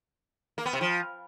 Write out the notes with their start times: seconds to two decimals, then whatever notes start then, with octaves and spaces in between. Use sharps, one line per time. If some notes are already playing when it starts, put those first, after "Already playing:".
0.58 A#3
0.66 B3
0.73 C3
0.81 F3